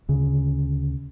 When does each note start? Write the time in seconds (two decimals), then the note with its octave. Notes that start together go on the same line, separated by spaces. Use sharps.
0.08 D2 C#3